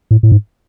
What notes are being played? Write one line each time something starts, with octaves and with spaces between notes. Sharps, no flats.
A2
A2
G#2